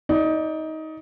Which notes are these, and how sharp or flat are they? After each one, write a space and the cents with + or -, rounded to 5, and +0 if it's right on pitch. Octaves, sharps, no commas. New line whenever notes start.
D#4 +20 D5 +0